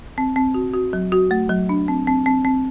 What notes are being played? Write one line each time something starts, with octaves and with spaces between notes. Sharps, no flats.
C4
C4
F#4
F#4
F#3
F#4
A3
F#3
D4
C4
C4
C4
C4